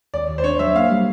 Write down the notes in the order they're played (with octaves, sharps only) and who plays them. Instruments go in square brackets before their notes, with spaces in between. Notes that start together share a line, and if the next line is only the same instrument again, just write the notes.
[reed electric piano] D#2 [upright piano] D5
[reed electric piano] D#2
[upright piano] C5
[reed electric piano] D4 [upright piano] C#5
[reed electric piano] F#3 [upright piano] E5
[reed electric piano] A#3 [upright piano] F5
[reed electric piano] G3